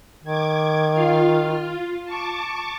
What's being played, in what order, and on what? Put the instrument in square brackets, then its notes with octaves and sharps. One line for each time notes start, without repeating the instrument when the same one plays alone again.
[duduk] D#3 [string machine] D6 G#6
[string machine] F4 F5
F4
A5 C#6 D6